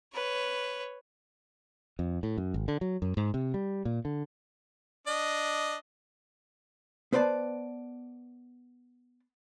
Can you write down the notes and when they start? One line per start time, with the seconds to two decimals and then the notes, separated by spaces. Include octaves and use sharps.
0.13 B4 C#5
1.99 F2
2.23 A2
2.37 F#2
2.54 G#1
2.68 D3
2.81 F#3
3.02 F#2
3.17 G#2
3.34 C3
3.54 G3
3.85 A#2
4.05 D3
5.07 D4 D#5
7.12 B3 B4 C5 D5 A5